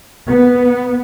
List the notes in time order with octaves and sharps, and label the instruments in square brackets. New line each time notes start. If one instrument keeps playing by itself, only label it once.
[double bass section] B3